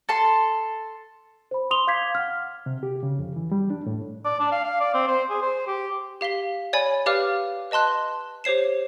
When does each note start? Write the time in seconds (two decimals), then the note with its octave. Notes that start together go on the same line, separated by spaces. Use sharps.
0.09 A4 A5 C6
1.51 C5 B5
1.71 C6 D#6 F7 G7
1.87 F5 D6 G6 G#6 B6 C7
2.15 F#5 F6
2.66 C3
2.83 G4
3.03 C#3
3.19 F2
3.36 E3
3.51 G3
3.70 D4
3.86 A2
4.25 D5
4.40 D4
4.52 F5
4.64 F5
4.80 D5
4.94 C4
5.08 C5
5.30 G#4
5.42 C5
5.67 G4
6.21 G4 F5 B6 G7
6.73 C#5 D5 G#5 B5
7.06 G4 B4 D5 F5 D6 F6
7.71 B4 D#5 A5 C6 F#6
8.44 G4 C5 C#5 C7 E7